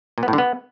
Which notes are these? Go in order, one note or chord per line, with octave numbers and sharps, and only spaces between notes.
A#2
B3
A2
D3
B3